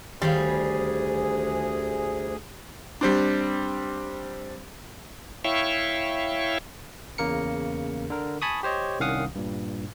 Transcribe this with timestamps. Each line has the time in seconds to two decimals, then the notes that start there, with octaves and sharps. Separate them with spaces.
0.22 D2 D#3 G3 G#4 C5 C#5 F5
3.01 G3 C4 D4
5.44 E4 C#5 E5 F5 G5 C#6
7.18 E2 C#3 A#3 A#4 C#7
8.10 D3 A#4
8.42 G#5 A5 B5 C#6 D#6
8.63 G4 C5 C#5 D#5
9.00 C2 D#3 C#4 F5 F#5 D#6
9.35 G2 A#2